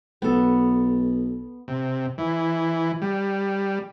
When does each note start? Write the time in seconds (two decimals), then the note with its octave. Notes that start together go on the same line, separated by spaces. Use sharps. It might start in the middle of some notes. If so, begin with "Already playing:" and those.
0.22 B1 B3 A4
1.68 C3
2.18 E3
3.02 G3